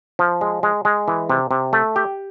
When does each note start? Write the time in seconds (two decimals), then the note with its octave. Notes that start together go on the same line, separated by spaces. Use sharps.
0.19 F3
0.41 G#3
0.63 G#3
0.85 G#3
1.08 E3
1.30 C3
1.51 C3
1.73 A3
1.96 G4